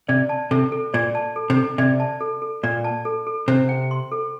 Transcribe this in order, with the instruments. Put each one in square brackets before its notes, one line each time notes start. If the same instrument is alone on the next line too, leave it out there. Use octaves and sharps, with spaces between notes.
[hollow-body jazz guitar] C3 [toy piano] D5
[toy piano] A5
[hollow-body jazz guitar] C3 [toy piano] A4
[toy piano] A4
[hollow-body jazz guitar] A#2 [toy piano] D5
[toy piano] A5
A4
[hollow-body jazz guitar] C3
[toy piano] A4
[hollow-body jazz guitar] C3 [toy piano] D5
[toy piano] A5
A4
A4
[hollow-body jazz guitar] A#2 [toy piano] D5
[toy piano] A5
A4
A4
[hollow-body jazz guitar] C3 [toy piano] C5
[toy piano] G5
C6
A4